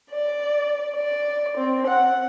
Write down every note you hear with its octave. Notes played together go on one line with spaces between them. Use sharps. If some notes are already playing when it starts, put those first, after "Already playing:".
D5
D5
C4
F#5